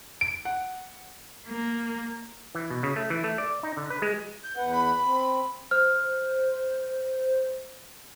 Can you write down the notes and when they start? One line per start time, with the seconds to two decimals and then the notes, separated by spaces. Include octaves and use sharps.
0.21 D7
0.45 F#5
1.48 A#3
2.55 E3
2.70 B2
2.83 C#3
2.96 A3
3.10 E3
3.24 A3
3.38 D5
3.63 D#4
3.77 D3
3.90 B4
4.02 G#3
4.43 G6
4.57 E2 B4 F#5
4.72 B5
5.03 C4
5.71 C5 F6